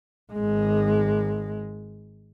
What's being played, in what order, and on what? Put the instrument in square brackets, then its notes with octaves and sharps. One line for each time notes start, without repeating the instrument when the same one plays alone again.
[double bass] G#1 G#3